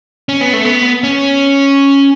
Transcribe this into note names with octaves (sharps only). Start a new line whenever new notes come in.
C#4
B3
A3
B3
C#4